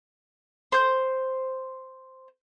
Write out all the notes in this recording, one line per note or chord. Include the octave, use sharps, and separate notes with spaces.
C5 G6